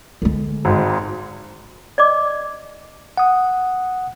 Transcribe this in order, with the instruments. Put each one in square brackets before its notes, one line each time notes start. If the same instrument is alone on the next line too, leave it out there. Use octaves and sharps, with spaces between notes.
[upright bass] D3 G#3
[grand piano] G#1 G#2
[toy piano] D5 D#5 D6
[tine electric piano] F#5 D#6